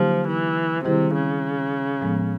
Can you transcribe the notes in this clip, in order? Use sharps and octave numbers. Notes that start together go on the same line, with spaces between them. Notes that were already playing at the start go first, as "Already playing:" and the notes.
Already playing: D3 F3 F#3 A#3 D#4 G4
E3
C3 D#3 G3 C4 E4 G#4
C#3
A2 F3 G#3 B3